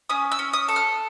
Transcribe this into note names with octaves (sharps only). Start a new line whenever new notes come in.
C#4 D#6
E6
C#4
D#6
A4
F6